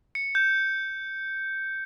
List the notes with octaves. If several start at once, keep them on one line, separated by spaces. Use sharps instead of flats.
C#7
G6